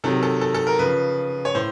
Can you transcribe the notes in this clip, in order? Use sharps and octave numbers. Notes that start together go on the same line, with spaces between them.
C3 D#3 F#3 A4
A4
A4
A4
A#4
C#3 F3 B4
C#5
A2 C5